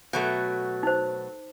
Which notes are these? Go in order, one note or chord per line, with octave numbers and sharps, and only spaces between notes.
B2 F#3 A3
D#4 C5